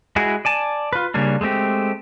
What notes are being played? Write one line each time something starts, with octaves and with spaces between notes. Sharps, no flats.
G#3 E4 F#4 G#4
D5 G#5 A5
F4 B4
C#3 G3 A#3 C#4 D4
G#3 A3 C4 G4